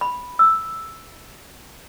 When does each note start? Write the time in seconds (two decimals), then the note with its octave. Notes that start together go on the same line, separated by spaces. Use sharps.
0.01 B5
0.39 E6